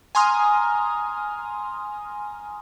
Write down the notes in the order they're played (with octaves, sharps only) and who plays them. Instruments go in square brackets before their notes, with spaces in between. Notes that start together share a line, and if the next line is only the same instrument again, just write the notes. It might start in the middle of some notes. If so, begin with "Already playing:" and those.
[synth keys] G#5 A#5 C6 D#6 F6